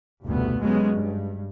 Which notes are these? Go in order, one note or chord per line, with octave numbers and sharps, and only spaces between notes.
F1 D2 G2 B2 A3 B3
C3 F#3 G#3 B3 C#4
G2